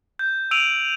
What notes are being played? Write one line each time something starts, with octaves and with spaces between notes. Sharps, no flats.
G6
E6 D7 D#7 F7 F#7